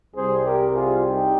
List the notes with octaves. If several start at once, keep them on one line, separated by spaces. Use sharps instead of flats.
C2 C3 G3 G#4 C5
G4 A#4
F4 G#4
D#4 G4